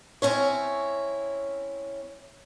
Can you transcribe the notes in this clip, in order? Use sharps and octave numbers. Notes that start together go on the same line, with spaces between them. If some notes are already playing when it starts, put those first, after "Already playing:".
C4 C#4 E4 C#5